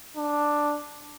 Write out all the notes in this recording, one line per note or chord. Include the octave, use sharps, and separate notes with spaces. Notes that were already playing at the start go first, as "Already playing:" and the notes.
D4